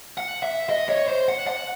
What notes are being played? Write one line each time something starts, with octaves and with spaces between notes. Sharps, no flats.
F#5
E5
D#5
C#5
C5
F#5
F#5